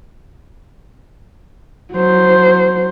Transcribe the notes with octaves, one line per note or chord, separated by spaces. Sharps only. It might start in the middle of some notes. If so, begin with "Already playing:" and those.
F#3 C5